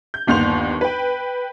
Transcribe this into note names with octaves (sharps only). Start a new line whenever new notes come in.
G6
G1 D#2 B3 C6 G6 F7
B4 G5